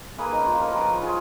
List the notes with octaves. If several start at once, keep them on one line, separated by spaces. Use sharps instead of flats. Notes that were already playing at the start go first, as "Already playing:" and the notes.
A#3 G#4 B4
C#4 D#4
F4
F3 A#4 C#5
F3 G#4 A#4 B4
F3
F4 G#4